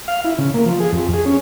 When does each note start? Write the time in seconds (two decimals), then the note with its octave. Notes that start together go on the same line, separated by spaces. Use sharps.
0.08 F5
0.25 E4
0.38 C#3
0.54 A#3
0.66 F3
0.80 G#4
0.92 F2
1.14 G#4
1.26 C#4